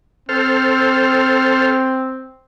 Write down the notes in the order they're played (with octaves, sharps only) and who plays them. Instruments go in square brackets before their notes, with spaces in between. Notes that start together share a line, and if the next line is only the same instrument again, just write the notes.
[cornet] C4 [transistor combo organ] A4 C5 F6